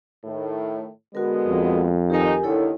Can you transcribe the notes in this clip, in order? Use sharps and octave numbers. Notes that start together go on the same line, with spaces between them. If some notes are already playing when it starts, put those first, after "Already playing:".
A2 D#3
D3 G#3 B3 F#4 A#4
F2
D#3 D#4 G4 A#4 G#5
D#2 D3 D#3 E4 A4 C#5